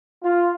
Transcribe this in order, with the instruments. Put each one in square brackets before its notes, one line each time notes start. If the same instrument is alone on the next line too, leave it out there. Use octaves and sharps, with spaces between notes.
[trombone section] F4